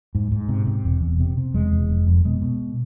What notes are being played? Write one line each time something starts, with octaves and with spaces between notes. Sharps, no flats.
G#2
G#2
C3
C3
E1
E2
C3
C3
E1 G#3
E2
F1
F2
B2 G#3
B2